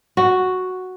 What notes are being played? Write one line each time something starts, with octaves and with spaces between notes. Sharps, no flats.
F#4